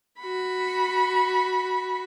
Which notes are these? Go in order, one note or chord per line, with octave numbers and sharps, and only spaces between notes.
F#4 B5